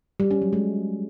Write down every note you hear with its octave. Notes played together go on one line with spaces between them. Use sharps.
G3
C#4
F#3
G#3